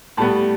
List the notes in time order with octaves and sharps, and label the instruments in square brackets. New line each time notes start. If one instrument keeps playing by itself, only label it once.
[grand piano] A2 G3 B3 A5